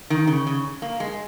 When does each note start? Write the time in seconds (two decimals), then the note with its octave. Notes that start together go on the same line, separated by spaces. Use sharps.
0.10 D#3
0.27 C#3
0.47 C#3
0.82 A#3
1.00 G#3